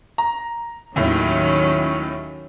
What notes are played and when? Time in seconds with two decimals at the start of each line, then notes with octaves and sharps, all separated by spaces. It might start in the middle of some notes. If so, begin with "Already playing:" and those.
0.18 A#5
0.96 D#2 A2 D#3 F#3 C#4